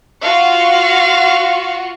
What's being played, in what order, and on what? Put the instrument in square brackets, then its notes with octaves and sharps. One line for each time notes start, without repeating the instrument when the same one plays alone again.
[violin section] F4 F#4 C#6 [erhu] F5